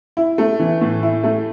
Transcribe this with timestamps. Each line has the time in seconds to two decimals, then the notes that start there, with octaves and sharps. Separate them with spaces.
0.17 E4
0.38 A3
0.60 E3
0.81 A2
1.03 E4
1.23 A3